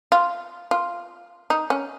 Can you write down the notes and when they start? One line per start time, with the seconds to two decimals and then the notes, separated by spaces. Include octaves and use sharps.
0.12 F4
0.71 F4
1.50 D#4
1.70 C#4